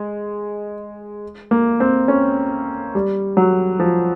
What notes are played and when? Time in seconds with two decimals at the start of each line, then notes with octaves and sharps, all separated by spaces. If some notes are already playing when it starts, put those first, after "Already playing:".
Already playing: G#3
1.51 A#3
1.80 C4
2.08 C#4
2.95 G3
3.37 F#3
3.80 F3